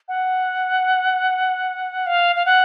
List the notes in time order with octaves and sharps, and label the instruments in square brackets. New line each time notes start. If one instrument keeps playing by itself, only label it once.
[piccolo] F#5
F5
F5
F#5